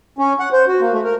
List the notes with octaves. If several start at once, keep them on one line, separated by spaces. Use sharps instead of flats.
C#4
F#5
C5
F#4
A#3
A3
A#4